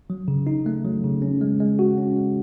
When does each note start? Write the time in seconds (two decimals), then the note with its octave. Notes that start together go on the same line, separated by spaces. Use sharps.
0.10 F#3
0.28 C#3
0.47 D#4
0.66 A3
0.85 F#3
1.04 C#3
1.22 C#4
1.41 G#3
1.60 G#3
1.79 F#4
1.98 C#4
2.17 G#3